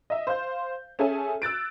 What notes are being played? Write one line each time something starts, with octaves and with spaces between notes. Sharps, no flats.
D#5 E5
C5 F5 G6
C#4 G#4 A4 E5 G#5
E6 F#6 A6 D7